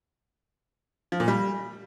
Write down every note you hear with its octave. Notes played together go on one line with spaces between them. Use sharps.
F3
A#2
G3